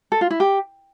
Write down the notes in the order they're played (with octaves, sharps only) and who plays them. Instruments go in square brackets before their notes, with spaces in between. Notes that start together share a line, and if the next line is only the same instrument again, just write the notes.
[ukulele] A4
F4
E4
G4